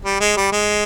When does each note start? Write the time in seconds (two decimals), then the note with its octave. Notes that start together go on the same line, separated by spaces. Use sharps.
0.05 G3
0.20 G#3
0.37 G3
0.52 G#3